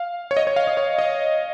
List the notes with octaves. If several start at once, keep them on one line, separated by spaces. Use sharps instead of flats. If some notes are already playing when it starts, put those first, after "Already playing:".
Already playing: F5
C#5
D#5
C#5
F5
D#5
C#5
D#5